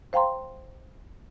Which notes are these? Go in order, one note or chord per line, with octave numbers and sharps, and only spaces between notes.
C5 F5 G5 A#5 C6